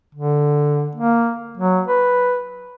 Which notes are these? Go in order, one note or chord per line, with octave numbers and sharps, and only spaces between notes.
D3
A#3
F#3
B4